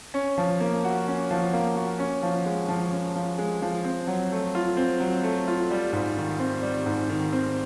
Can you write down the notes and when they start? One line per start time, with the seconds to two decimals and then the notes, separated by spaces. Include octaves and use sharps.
0.14 C#4
0.38 F3
0.61 A#3
0.84 F#4
1.08 C#4
1.31 F3
1.53 A#3
1.76 F#4
1.99 C#4
2.23 F3
2.46 G#3
2.68 F3
2.92 C#4
3.15 F3
3.38 G#3
3.62 F3
3.84 C4
4.07 F#3
4.31 A3
4.55 F4
4.77 C4
5.00 F#3
5.23 A3
5.48 F4
5.71 G3
5.93 G#2
6.17 D#3
6.39 C4
6.63 G3
6.86 G#2
7.09 D#3
7.33 C4